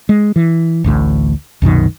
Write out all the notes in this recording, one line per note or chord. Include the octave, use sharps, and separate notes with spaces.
G#3
E3
A1 D2 A2
C2 F#2 B2 D#3